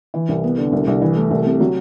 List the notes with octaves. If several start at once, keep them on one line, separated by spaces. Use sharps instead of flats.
E3
C2
B3
D3
C2
C2
E3
A3
C2
C3
F#3